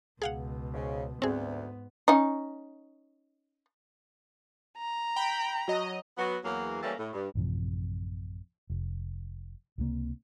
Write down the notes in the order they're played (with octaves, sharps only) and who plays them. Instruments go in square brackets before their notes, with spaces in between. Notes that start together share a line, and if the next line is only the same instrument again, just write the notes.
[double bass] C#2 B2 [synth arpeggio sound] G#4 F5 F#5
[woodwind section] G#2 C#3
[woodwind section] D2 [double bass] G#2 B3 [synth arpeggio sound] C4 G#4
[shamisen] C#4 D#4
[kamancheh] A#5
[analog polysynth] G5 B5
F#3 D#5
[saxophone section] F#3 B3 F#4
E2 F#3 A#3
E3 G3 A3 A#3 C#4 A4
A2
G2
[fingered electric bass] A1 F#2 C3 F3
F1
C#2 C3 E3 A#3